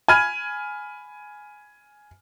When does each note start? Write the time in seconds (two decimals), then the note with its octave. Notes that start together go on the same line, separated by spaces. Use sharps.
0.08 G#5 B5 F6 G#6 D#7